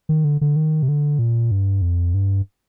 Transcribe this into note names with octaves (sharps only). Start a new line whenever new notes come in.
D#3
D3
D3
D#3
C3
D3
A#2
G2
F2
G2